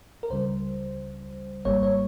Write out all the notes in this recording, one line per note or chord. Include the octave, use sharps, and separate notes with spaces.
A#4
C#2 C#3 G3 C5
G#1 G#2 G3 A#3 C#5
C#5